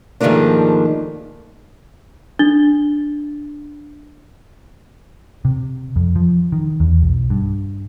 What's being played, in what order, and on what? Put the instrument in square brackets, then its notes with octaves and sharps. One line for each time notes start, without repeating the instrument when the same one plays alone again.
[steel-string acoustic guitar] G#2 D#3 F3 A3 A#3 D4
[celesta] D4 A6 G7
[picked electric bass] C3
F2
F3
D#3
E2
B1
G2